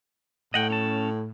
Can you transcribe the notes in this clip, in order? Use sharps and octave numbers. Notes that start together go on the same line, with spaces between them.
A2 D#5 F#5 G5
C#4 A5